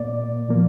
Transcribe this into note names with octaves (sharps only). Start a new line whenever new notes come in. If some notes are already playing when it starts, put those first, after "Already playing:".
Already playing: A#2 A#3 D5
A#2 F3 A#3